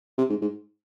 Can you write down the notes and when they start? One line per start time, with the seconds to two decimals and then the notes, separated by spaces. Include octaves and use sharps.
0.18 C3
0.29 G#2
0.41 G#2